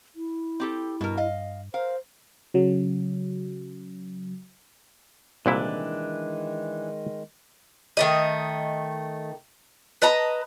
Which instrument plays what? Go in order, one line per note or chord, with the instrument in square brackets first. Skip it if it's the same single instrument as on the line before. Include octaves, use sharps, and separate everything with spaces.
[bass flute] E4
[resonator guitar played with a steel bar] C4 G4 A4
[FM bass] G2 [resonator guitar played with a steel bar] B2 A#4
[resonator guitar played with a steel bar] D#5 F5
[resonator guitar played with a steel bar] A#4 F5 [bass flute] C5
[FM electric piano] C#3 F#3
[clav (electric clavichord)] C2 A#2 E4 [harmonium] D#3 G#3 [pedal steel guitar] E3 D4
[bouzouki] D#3 A3 D#5
B4 D#5 A5 A#5